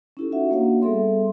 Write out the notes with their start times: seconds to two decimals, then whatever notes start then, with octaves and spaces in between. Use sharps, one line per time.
0.17 C#4 D#4 E4 G4 A4
0.32 C#4 F4 F#4 E5 F#5
0.51 A#3 D4 F#4 C#5 F5 F#5
0.82 G3 B3 G#4 A4 E5 C6